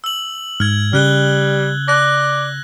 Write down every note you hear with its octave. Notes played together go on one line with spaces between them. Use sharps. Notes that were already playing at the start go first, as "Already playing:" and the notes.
E6 F#7
G#2 F6 G#6
C#3 G3 F6 F#6 G7
D5 F#6 A#6